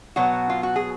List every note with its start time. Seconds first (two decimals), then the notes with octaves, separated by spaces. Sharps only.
0.16 B2 F#3 B3 F#4
0.50 F4
0.63 F#4
0.76 G#4